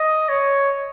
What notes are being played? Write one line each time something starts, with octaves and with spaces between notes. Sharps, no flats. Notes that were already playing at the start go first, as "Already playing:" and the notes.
Already playing: D#5
C#5